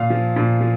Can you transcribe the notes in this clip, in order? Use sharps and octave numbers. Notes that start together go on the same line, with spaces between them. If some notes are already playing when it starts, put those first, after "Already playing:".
Already playing: A#2 F5
F3
A#2
F3